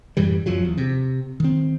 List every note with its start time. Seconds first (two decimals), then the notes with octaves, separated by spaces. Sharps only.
0.17 F#2 A2 E3 G3
0.46 D1 F#2 F3 F#3
0.65 E2
0.78 C3
1.40 D#3 C4